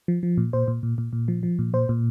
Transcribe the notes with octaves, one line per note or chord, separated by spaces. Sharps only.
F3
F3
A#2
A#2 C5
A#2
A#2
A#2
A#2
F3
F3
A#2
A#2 C5
A#2